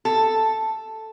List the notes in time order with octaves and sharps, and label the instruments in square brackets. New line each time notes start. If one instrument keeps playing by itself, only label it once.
[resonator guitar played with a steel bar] A4